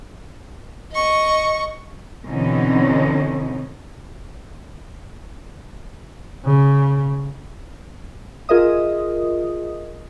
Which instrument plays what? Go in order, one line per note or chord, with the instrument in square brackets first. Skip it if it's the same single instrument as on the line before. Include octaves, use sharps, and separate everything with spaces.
[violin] D#5 C#6
[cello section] B2 D3 E3 C4 C#4 D#4
[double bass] C#3
[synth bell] F4 G#4 A#4 D#5 E5 D#6